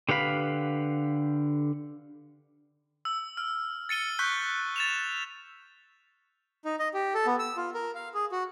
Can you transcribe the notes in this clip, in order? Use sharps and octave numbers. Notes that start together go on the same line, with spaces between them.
D3 G4 B4 F5 B5
E6
F6
A6 C#7 D#7 G7
C#6 F#6 G6 B6 G7
A6 E7 F7
D#4
D#5
G4
A4
B3
E6
F4
A#4
F5
G#4
F#4